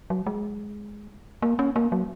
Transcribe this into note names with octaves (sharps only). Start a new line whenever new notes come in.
F#3
G#3
A#3
C#4
A#3
F#3